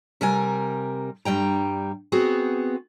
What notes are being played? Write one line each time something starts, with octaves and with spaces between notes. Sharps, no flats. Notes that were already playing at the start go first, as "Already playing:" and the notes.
C3 G3 A#4 G#5
G2 G3 G5 A#5
B3 C4 F#4 G#4